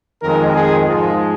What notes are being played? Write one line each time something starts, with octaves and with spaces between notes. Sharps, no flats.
F2 D#3 G#3 A#4
G#4
G#2 F3 G#3 F4